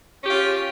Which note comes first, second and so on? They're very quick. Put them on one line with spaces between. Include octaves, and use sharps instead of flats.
C#4 G4 F4